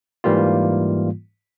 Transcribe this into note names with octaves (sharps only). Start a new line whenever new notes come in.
G#2 E3 G3 A#3 F4